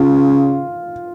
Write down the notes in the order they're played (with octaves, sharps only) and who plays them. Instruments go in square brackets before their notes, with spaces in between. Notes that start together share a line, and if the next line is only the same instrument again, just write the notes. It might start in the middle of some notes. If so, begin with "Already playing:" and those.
Already playing: [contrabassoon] C#3 [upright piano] F4